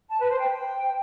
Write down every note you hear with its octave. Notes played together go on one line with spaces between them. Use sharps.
A5
B4
C5
G5